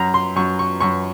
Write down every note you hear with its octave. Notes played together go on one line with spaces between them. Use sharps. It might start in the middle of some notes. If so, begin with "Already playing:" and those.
Already playing: F#2 A#5
C6
F#2 C#6
C#6
F#2 C#6